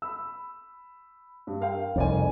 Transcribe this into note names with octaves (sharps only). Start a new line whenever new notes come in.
B5 E6
G2
A#4 F5 G5
C2 F2 D#4 D5 G#5